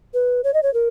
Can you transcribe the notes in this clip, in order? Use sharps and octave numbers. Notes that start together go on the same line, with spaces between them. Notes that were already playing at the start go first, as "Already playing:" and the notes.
B4
C#5
D#5
C#5
A#4